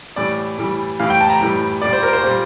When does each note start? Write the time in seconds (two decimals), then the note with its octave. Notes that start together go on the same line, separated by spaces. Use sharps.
0.16 A2 E3 G3 D5
0.58 A2 E3 G3
0.99 A2 E3 G3 F5
1.10 G5
1.21 A5
1.30 A#5
1.41 A2 E3 G3
1.82 A#2 G3 D5
1.93 C5
2.03 A#4
2.13 C5
2.23 A#2 G3